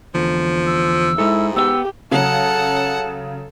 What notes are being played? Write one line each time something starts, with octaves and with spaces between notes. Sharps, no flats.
E2 D3 F3
E6
G#2 G#3 E4 A4
B3 G4 D#5 G5 E6
C#3 F#3 A4 F#5 A5